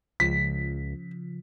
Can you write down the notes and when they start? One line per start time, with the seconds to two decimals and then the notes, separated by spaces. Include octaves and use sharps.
0.20 C#2 C#3 F3 B6